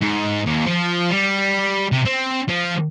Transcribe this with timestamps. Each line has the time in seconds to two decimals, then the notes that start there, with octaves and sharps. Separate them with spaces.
0.01 G#2
0.46 D#2
0.66 F3
1.11 G3
1.92 C3
2.05 C4
2.49 F3